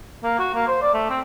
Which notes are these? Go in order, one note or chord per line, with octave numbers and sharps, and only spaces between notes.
A#3
F#4
A#3
C5
D5
A3
C4